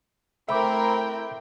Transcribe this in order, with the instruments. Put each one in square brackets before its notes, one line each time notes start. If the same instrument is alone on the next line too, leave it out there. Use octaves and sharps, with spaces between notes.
[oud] A3 [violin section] C4 A#4 [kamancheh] E4 G5 [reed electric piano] E5 B5 D6